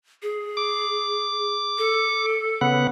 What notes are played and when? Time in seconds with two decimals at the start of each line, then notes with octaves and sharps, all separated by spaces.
0.22 G#4
0.57 D6
1.78 A4
2.61 C#3 B3 F#5